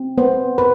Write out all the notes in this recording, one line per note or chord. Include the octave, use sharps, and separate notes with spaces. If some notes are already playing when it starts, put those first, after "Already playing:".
Already playing: C4
B3 C5
B4